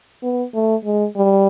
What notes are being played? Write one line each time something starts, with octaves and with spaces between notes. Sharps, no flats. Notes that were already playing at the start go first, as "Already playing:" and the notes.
B3
A3
G#3
G3